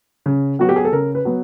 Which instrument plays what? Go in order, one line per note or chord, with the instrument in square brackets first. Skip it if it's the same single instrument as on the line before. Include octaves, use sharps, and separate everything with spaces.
[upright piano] C#3
F#3 B3 F#4
G4
G#4
A4
C#3 A#4
B4
F#3 B3